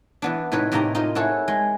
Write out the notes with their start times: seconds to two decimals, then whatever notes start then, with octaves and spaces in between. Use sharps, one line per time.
0.22 E3 B3 D4
0.52 A2 C3 D#4 B4 C#5
0.72 A2 C3 A#3 D#4 G4 A#5
0.95 D#4 F4 C5 D#5
1.15 E4 F#4 G#4 A4 C#5
1.48 G#3